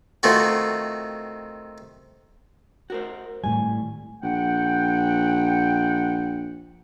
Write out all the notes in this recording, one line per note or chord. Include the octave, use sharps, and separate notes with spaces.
C3 D#3 A3 F4 F#4
F#4 A#4 C5
G#1 A2 G3 G#5
A#1 F#5 G5